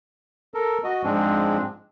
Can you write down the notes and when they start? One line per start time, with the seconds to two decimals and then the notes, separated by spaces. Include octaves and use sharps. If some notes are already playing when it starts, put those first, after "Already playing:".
0.54 A4 A#4
0.84 F#4 D#5
1.04 G#2 F3 G#3 C4 D4